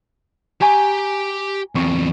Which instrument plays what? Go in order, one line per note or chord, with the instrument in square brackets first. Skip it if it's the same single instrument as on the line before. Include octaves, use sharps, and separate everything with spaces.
[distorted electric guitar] G4 G5 [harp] G#5 A#5 C#6
[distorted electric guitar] E2 C4 [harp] C#6